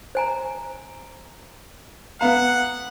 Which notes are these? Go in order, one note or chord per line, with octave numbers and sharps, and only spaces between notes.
C5 G#5 A#5
B3 F5 F#5 A#5